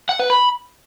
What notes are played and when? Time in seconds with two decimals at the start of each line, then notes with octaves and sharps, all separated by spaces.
0.09 F#5
0.19 B4
0.30 B5